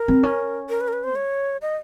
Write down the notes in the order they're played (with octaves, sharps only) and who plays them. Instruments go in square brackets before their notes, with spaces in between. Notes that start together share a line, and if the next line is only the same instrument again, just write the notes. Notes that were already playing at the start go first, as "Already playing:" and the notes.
Already playing: [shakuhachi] A#4
[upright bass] C4
C#4
[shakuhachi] A#4
B4
A#4
B4
C5
[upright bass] G3 [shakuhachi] C#5
[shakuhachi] D#5